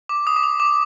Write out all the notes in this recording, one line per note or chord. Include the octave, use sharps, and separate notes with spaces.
D6
D#6
D6
D#6
D6